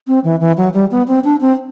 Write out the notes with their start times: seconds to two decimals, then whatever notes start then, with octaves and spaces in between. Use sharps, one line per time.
0.08 C4
0.24 E3
0.40 E3
0.57 F#3
0.74 G3
0.91 B3
1.08 C4
1.24 D4
1.41 C4